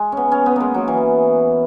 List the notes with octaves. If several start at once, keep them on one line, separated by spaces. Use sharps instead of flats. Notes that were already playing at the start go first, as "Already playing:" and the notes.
Already playing: G#3
B3 C#4
C#4
B3
G#3 A#3
F#3
E3